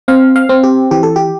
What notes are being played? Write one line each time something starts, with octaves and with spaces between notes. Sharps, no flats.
C4 F5
F5
C4
G4
E3 G4
A4
G4